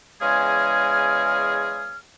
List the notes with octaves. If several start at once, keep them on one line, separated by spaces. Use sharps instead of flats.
E2 C#3 G#3 G#4 G#5 F6